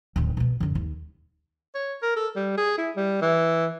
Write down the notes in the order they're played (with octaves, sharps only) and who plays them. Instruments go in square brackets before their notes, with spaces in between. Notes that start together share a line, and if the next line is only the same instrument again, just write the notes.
[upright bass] D1 D#3
B2 B3
F#2 D3
D#2
[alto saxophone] C#5
A#4
A4
G3
G#4
E4
G3
E3